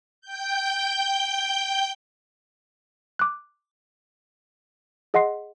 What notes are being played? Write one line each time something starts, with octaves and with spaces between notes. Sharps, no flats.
G5 G6
D6 F#6
G#4 D#5 F#5 C6 C7